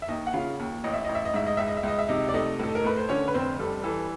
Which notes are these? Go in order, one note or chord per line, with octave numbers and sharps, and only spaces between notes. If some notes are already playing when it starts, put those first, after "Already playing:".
E5
D#2 D#4 D#5
F#5
C#3 F4 F5
D#2
A1 D#5
E5
A1 D#5
E5
D#5
G#2 E5
D#5
C#2 E5
D#5
E5
C#2 D#5
E5
C3 D#4 D#5
D5
A3 D#4 D#5
A2 A4
A#4
A3 B4
C5
D3 C#4 C#5
B4
F1 C4 C5
G3 A4
E3 A4